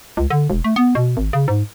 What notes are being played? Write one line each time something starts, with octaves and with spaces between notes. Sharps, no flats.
C#2
D3
E1
A3
B3
B2
G#1
C#3
G#2